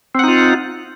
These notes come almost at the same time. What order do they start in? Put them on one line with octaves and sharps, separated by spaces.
C4 F#5 D#4 F4